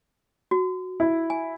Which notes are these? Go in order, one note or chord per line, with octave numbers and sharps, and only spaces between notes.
F#4
E4
G#5